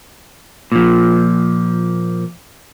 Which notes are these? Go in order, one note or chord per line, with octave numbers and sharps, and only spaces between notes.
A#2 F3